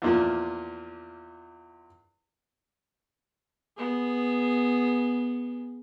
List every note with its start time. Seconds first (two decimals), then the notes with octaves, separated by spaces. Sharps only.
0.02 E2 A#2 F3
3.77 B3 G#4